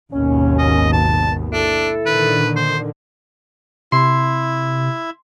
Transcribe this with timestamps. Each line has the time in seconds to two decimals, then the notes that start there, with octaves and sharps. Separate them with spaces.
0.12 G#1 D#2 B2 C#4
0.59 D#5
0.93 A5
1.53 D4 E4 A4
2.06 A#2 D3 D#3 B4
2.56 C5
3.92 C3 E4 C6